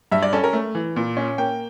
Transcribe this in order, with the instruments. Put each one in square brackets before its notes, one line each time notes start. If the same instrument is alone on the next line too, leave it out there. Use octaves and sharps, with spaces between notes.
[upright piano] G2 E5
D5
C#4 A4
A#4
A3
E3
A#2
C#4
A#3 G5